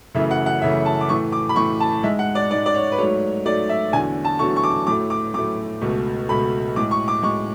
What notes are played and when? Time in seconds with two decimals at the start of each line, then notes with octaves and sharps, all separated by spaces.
0.15 F#2 C#3 E3 A3 E5
0.31 F#5
0.46 F#5
0.62 F#2 C#3 E3 A3 E5
0.86 A5
1.01 D6
1.09 A2 E3 A3 C#6
1.32 D6
1.49 B5
1.56 A2 E3 A3 C#6
1.80 A5
2.03 G#2 G#3 E5
2.19 F#5
2.35 D5
2.51 G#2 D5
2.54 G#3
2.66 D5
2.74 C#5
2.92 B4
2.98 G#2 F#3 A3 C#5
3.45 G#2 F#3 A3 D5
3.69 E5
3.92 E2 D3 F#3 A3 G#5
4.25 A5
4.39 E2 D3 F#3 A3 C#6
4.56 C#6
4.63 D6
4.87 A2 F#3 A3 D6
5.10 D6
5.34 A2 F#3 A3 D6
5.81 C#2 B2 A3
6.29 C#2 B2 A3 B5
6.76 A2 G#3 D6
6.91 C#6
7.08 D6
7.23 A2 G#3 C#6